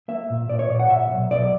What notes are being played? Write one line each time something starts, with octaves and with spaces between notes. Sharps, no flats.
A#3 E5
A#2
A#2 D5
C#5
A#2 D5
F#5
A#2 E5
B1
B1 D5